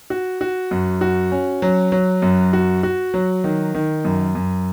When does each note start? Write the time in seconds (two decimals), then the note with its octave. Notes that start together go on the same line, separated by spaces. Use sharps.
0.10 F#4
0.41 F#4
0.71 F#2
1.01 F#4
1.32 C#4
1.62 F#3
1.92 F#3
2.22 F#2
2.53 F#4
2.83 F#4
3.14 F#3
3.44 D#3
3.74 D#3
4.05 F#2
4.35 F#2